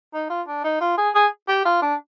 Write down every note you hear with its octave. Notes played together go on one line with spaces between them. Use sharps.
D#4
F4
D4
D#4
F4
G#4
G#4
G4
F4
D4